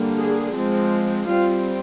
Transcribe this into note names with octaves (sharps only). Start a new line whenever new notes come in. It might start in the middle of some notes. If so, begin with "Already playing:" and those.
Already playing: D3 G3 A#3
G#4
F3 G#3 C4
G3 C4 F4